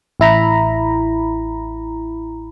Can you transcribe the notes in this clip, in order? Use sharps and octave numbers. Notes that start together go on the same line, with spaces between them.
A1 E4 A#5 B5